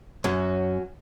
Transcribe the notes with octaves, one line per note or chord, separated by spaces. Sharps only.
F#2 F#3 C#4